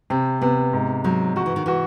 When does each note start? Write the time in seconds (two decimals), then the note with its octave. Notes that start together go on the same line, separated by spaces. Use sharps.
0.10 C3 C4
0.41 C3 B3
0.73 G#2
1.04 G#2 F#3
1.36 F3 F#4
1.46 E3
1.56 D#3
1.66 E3 F#4